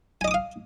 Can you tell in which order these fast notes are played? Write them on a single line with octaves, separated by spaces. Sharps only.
G#5 D#5 D6 D#6 F5